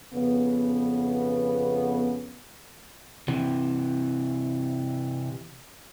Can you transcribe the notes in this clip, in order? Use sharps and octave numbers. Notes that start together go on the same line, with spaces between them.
F2 C#3 B3
C3 E3